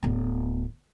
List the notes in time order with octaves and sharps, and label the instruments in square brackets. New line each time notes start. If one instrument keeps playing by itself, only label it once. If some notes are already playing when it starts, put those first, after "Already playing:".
[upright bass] D1 B3